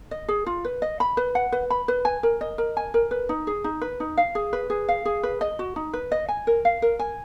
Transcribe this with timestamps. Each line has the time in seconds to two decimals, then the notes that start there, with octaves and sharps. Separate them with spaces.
0.11 D#5
0.28 G#4
0.46 F4
0.65 B4
0.82 D#5
1.00 B5
1.17 B4
1.35 F#5
1.52 B4
1.70 B5
1.88 B4
2.05 G#5
2.23 A#4
2.41 D#5
2.58 A#4
2.77 G#5
2.94 A#4
3.11 B4
3.29 D#4
3.47 G#4
3.64 D#4
3.82 B4
4.00 D#4
4.17 F5
4.35 G#4
4.53 B4
4.70 G#4
4.88 F5
5.05 G#4
5.23 B4
5.41 D#5
5.59 F#4
5.76 D#4
5.93 B4
6.12 D#5
6.28 G#5
6.47 A#4
6.65 F5
6.82 A#4
6.99 G#5